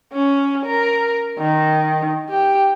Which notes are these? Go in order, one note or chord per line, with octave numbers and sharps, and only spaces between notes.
C#4
A#4
D#3
G4